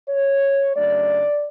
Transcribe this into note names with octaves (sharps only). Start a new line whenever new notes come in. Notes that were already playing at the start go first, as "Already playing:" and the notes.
C#5
C#3 F#3 A3 D4 D5